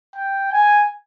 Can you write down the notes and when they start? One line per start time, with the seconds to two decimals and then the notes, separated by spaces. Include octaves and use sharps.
0.16 G5
0.53 G#5